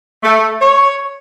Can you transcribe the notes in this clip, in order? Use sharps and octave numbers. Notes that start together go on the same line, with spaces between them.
A3
C#5